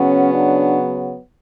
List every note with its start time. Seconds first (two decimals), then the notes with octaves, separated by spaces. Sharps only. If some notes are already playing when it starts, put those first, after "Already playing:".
Already playing: C#3 F#3 B3 C#4
0.32 D4